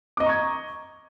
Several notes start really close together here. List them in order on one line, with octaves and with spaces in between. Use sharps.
D6 D#5 A#5 C#6 G#6